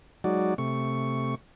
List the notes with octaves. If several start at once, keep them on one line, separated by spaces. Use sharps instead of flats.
F#3 G#3 D#4 F#4 D5
C3 A3 C#6